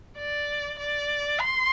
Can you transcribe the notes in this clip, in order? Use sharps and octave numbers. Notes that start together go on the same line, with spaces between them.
D5
D5
C6